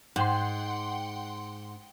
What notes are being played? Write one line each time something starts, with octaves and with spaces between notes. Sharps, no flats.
G#2 F#5 G5 C6